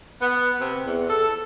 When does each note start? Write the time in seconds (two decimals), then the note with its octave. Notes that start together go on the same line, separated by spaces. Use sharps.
0.21 B3
0.60 C3
0.86 E2
1.10 A4